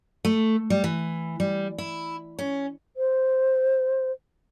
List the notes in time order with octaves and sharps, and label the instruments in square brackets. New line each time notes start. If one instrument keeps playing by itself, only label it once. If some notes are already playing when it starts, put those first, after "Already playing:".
[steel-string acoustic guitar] A3
G3
E3
G3
E4
C#4
[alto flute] C5